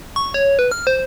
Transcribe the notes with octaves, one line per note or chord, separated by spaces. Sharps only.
C#6
C#5
B4
F6
C5